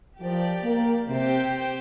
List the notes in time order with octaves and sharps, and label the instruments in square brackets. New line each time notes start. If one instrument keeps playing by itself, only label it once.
[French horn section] F3 [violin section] G4 A#4 D5
[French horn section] A#3
[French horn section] C3 [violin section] C4 G4 C5 G5